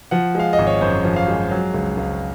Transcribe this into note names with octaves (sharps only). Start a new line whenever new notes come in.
F3 F#5
G#3 F5
D#5
G#1
C#5
F#2 C5
F3
F5
G#3
F#3
C#2
C#2